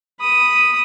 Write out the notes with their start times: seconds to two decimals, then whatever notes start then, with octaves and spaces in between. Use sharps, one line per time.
0.20 B5 D#6